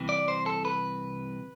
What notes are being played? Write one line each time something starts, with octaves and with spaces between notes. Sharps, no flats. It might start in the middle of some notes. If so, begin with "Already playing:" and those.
Already playing: C2 C3 E3
D5
C5
A4
B4